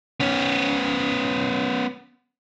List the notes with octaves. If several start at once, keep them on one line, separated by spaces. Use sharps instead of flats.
B3 C#4